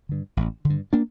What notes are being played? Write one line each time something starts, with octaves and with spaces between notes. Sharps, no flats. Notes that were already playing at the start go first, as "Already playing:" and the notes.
G2 D3
A1
D3
G2
A#3 D4